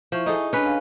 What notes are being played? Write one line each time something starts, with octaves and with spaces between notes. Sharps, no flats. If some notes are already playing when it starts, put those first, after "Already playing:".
F3 E4 E5 C#6
D#4 G#4 A4
C#4 D4 B4 G#5 B5
F5